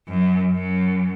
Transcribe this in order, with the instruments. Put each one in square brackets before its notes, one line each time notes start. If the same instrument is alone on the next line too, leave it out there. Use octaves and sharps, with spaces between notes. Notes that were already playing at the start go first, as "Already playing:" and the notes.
[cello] F#2
F#2